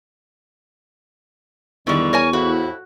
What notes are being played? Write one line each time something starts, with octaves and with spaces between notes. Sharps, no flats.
E2 G2 D3 D#3 G3 C#6
A#4 C#5 G#5
F2 A2 E4 F#4